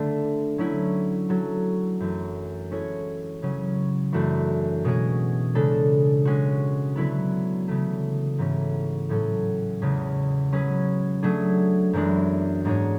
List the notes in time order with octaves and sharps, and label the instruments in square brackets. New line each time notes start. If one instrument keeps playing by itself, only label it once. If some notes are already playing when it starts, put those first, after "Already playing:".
Already playing: [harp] D3 A3 D4
F#3 A3 C#4 E4
F#3 C#4 F#4 A4
F#2 E3 A3
G#3 C#4 E4 A4 C#5
C#3 F#3 C#4
F#2 E3 A3 D4 F#4
B2 G#3 C#4 G#4
C#3 G#3 D4 A4
G#3 C#4 F#4
D3 F#3 B3 E4 B4
C#3 E3 A3
G#2 E3 A3 C#4
A2 F#3 C#4 F#4 A4
E2 C#3 G#3 C#4
F#3 C#4 G#4 B4
F#3 A3 D4 G#4
F#2 E3 G#3 B3 D4
G#2 G#3 D4 G#4 C#5